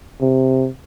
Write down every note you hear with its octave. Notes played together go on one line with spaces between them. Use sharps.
C3